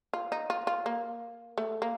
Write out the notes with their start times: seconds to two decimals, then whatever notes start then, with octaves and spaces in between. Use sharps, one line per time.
0.13 F4
0.32 D#4
0.50 F4
0.67 F4
0.86 A#3
1.58 A3
1.82 A#3